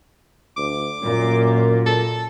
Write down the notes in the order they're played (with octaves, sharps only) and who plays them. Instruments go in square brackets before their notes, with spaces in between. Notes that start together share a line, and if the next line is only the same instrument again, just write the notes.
[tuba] D2 [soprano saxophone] D6
[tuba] F#2 [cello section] A#2
[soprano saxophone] A4